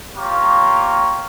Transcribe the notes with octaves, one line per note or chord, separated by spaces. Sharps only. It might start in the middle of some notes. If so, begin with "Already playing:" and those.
A#3 F4 G4 A#4 C#5 C#6